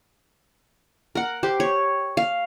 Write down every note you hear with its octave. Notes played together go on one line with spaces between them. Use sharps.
A#4 F#5
G4 C5
C#5
F5